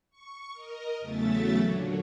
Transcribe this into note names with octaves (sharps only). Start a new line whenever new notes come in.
C#6
A#4 D#5
E2 C#3 F#3 A3 E5 A6
A#2 D3 F#3